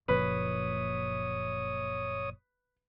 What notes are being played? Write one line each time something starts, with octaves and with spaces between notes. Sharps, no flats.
F#1 A#2 F3 B4 C#5 D#6